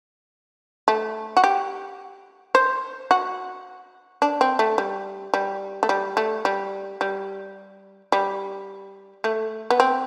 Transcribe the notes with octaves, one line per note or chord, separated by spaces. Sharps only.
A3
F#4
G4
C5
F#4
D4
C4
A3
G3
G3
A3
G3
A3
G3
G3
G3
A3
B3
C4